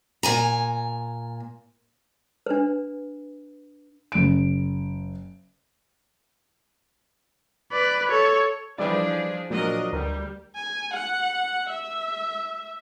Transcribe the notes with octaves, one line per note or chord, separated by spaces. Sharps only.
A#2 G#5 A#5
D4 B4
F#1 D7
B4 D5
A4 C#5
E3 F3 G3 D4 E4 G#4 D5
A#2 F3 F#3 D4 A#4 D#5
D2 G3 A#4
G#5
F#5
E5